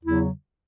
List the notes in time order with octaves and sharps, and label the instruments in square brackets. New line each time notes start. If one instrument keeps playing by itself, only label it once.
[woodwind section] E2 C#3 F#3 E4